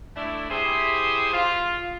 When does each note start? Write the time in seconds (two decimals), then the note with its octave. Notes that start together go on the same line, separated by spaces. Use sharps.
0.16 A3 D4 E4
0.50 E4 G4 G#4 C5 E5 C6
1.33 F4